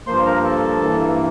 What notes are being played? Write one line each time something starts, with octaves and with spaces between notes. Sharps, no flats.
G2 F3 A#3 C5 C6
A#4 A#5
A4 A5
G2 E3 A#3